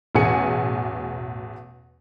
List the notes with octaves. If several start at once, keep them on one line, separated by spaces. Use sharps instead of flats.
A1 E2 B2 G#4 G#5 C#7